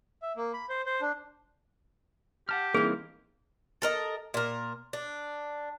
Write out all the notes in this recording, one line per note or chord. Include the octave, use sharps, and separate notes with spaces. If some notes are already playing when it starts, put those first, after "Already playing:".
E5
A#3
B5
C5
C5
D4
G4 F#5 A5 F6
E3 G3 A#3 C4 D#4 G#4
A4 A#4 D#5
A#2 A#4
D4